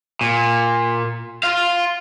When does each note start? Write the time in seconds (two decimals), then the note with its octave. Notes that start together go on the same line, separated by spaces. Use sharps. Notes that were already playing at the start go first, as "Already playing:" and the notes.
0.21 A#2
1.43 F4 F5